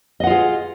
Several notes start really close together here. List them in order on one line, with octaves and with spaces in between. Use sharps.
D#5 F#5 F4 G#4